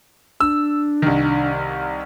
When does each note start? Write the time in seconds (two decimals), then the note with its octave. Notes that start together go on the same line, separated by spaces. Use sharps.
0.40 D4 E6
1.02 C2 D#3